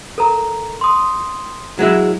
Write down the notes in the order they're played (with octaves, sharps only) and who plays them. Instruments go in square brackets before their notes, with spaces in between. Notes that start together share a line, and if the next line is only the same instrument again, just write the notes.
[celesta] A4 A#4 A#5
C6 D#6
[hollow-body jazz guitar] F#3 G#3 E4